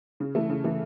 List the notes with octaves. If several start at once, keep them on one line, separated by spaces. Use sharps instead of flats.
C#3
E3 A3 E4
C#3
E3 A3 E4